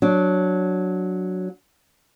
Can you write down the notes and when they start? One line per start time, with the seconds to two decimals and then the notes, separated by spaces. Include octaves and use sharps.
0.02 F#3 D4